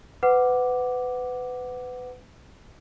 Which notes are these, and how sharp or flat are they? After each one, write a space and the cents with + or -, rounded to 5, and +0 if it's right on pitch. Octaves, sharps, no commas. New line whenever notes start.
B4 +30 F#5 +0 D6 +0